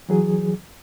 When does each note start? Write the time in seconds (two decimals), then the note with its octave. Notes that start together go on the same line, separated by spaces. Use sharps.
0.09 E3 F#3 G#4